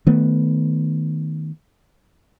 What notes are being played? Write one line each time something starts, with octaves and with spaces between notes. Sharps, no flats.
D#3 A3 B3